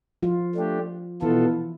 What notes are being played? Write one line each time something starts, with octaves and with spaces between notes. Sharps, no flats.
F3 F4
A3 D4 G4
B2 E3 B3 E4 F4 A4